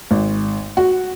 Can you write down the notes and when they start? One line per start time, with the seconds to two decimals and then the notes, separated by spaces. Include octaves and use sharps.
0.11 G#1
0.77 F#4